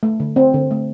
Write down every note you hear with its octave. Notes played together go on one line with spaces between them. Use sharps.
A3
D3
C4
D3
A3